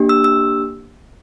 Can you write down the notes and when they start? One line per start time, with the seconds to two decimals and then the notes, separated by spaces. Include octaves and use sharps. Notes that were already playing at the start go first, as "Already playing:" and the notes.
Already playing: A#3 D4 G4
0.09 E6
0.24 E6